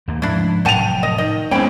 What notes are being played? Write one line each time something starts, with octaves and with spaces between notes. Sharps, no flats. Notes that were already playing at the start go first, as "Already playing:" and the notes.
D#2 A3 A#3
G#2 F3 D4 E4
F1 A2 F#3 F#5 G5 A5 D#7 F7
D#5
D#3 D#5
E2 G#3 A3 C4 C#4 G5 B5